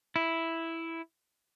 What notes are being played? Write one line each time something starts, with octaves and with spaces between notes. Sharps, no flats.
E4